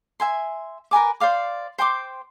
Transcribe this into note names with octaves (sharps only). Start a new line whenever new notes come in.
E5 G#5 C6
A#4 B4 G#5 D6
C5 D5 F5 D6
C5 G5 C6 D6